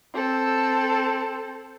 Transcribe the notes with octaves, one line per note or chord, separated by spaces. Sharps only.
C4 A4